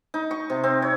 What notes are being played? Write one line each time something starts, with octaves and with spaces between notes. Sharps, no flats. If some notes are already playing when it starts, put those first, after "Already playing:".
D#4
C#6
C3
C4
C#5